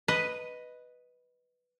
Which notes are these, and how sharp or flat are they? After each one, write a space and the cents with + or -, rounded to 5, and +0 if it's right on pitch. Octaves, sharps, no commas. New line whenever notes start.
B4 +0 D#5 +0